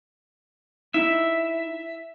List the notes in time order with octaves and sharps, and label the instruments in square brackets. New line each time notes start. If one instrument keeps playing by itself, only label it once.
[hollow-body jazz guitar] D#4 E4 [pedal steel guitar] E5